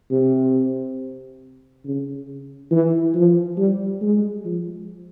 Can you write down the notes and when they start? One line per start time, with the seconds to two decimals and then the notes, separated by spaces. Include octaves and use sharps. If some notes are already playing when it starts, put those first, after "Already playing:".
0.11 C3
1.85 C#3
2.72 E3
3.15 F3
3.58 G3
4.01 G#3
4.45 F3